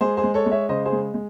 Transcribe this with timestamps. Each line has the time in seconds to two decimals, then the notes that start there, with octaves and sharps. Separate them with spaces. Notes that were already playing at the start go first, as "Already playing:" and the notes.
0.01 G#3 G#4 C5
0.17 G#4 C5
0.23 G#3
0.34 A4 C#5
0.46 G#3
0.51 C#5 E5
0.69 C#3 C5 D#5
0.85 G#4 C5
0.92 G#3
1.14 G#3